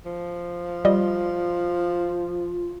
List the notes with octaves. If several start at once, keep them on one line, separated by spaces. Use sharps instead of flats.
F3
G3 F4 D#5